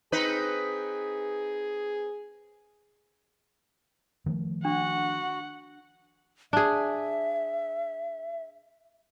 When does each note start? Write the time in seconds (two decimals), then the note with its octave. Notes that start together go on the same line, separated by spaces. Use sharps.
0.12 C4 D#4 G#4 B4
4.26 D#3 F3 A3
4.65 D4 F#4 F#5
6.53 D4 G#4 E5